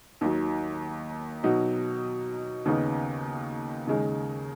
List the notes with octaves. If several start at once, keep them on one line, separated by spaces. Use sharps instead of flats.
D#2 D#3 F#3
B2 F#3 D#4 F#4
D#2 C#3 B3 D#4
D#2 C#3 G#3 D#4